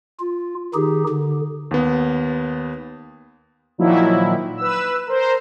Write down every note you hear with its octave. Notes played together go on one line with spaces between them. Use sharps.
F4
D#3 D#4 G4 G#4
D3
D#2 B3
A#2 D#3 F3 F#3 E4
B4 E6
A#4 C5